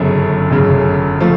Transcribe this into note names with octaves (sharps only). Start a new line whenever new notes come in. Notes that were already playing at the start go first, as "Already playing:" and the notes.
Already playing: G1 F#2 C#3
G1 F#2 C#3
F3 A3